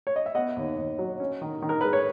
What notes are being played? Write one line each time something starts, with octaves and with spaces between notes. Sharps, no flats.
C#5
D#5
E5
B3 D#5 F#5
D#2
D#2
F#3
C#4
D#3
D#3
A#4
G#3 B4
C#5